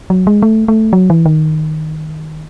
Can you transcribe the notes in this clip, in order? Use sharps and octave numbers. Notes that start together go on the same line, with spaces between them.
F#3
G#3
A3
A3
F#3
E3
D#3